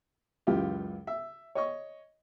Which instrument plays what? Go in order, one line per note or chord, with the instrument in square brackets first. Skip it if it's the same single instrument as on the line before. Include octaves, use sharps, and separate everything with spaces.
[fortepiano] C#2 F#2 E3 F4 G4
E5
C#5 D#5 C#6